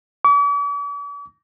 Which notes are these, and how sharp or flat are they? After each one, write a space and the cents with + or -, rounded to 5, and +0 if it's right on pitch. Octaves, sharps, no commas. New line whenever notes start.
D6 -45